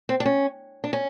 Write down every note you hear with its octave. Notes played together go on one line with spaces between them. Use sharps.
C4
D4
C#4
D4
C#4